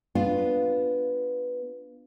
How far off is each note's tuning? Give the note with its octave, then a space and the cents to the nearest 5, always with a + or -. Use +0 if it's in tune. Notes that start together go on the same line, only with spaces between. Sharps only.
B3 +0 D4 +0 F4 +0